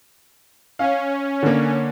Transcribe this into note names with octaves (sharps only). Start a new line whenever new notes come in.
C#4 F5
D3 A#3